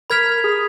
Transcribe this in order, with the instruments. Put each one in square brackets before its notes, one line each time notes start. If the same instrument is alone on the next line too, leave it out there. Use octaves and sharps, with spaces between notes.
[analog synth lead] A#4 [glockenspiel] B5 F6 G#6 B6 F7
[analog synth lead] G#4